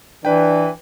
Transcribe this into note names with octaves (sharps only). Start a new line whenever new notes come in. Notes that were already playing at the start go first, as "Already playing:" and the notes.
E3 D4 B4 G5